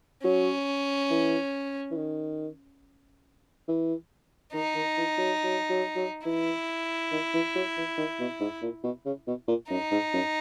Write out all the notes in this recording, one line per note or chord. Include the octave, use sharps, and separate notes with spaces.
F#3 C#4
E3
E3
D#3
E3
D#3 D#4
D#3
E3
F#3
F#3
F#3
F#3
E3 E4
D#3
E3
F#3
E3
D#3
B2
G#2
A#2
B2
C#3
B2
A#2
F#2 D#4
G#2
F#2